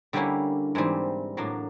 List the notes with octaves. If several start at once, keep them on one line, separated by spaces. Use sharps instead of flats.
D3 G3 A#3 C#4 E4
G#2 E3 G3 C4
A2 F#3 A#3 D4